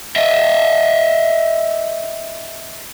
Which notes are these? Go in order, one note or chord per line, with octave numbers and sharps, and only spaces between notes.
D#5 E5